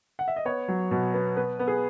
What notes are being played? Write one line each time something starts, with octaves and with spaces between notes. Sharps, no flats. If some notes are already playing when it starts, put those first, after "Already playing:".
F#5
E5
D#5
B3 C#5
F#3
B2
B3
B3 B4
B3
G#4